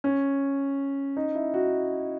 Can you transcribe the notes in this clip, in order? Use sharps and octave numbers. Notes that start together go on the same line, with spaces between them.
C#4
D#4
E4
F#4